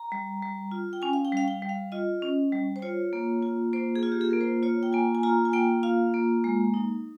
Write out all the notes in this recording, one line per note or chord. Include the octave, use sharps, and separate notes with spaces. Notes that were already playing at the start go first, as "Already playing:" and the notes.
Already playing: A#5
G3
G3
F4
G5
C#4 G#5
F5
G5
G3 F5
G5
G3
F5
F4 D#5
C#4
G3
C5
F4 C#5
A#3
F4
A#3 C5
G#4
F4
G4
G#4
A#3 A#4
C5
F4 C#5
G5
A#3 G#5
G#5
F4 A#5
G#5
A#3 G5
F4 F5
A#3
G#3
D#4